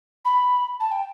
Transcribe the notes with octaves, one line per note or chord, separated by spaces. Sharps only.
B5
A5
G5